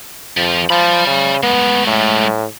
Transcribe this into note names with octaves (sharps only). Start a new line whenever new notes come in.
F2 F3
F3 D5 B5
C#3
G#3 A3 B3
A2